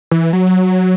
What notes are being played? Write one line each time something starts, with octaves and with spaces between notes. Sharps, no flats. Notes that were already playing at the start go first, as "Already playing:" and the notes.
E3
F#3